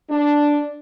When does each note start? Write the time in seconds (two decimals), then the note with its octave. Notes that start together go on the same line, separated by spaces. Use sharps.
0.10 D4